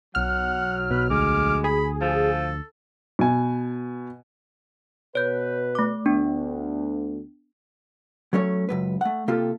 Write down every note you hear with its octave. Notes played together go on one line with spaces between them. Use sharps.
B1 F#3 F#5 F6
B2 B4
D2 G#3 D6
G#4 B5
F3 A4
B2 G#5
B2 B4 C#5 G6
A3 D6
D2 B3 D4
F#3 A3 C#4 C#5
C#2 F#2 B4
A3 F#5
C3 A#3 F4 G4 A4